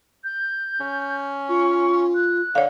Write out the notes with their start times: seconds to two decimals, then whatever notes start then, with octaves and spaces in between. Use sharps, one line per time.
0.24 G6
0.81 C#4
1.49 F4 C#6
2.15 F#6
2.55 D3 C#5 F5